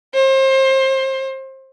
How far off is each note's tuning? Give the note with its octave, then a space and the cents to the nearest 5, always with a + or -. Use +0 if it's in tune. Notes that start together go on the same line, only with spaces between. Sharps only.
C5 +30